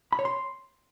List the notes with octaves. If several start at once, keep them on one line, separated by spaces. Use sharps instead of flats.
B5
C#5
C6